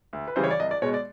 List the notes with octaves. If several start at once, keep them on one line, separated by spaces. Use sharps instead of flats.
D2
B4
C#3 E3 G3 C5
C#5
D5
C2 D#5
D5
B2 G#3 C#5
D5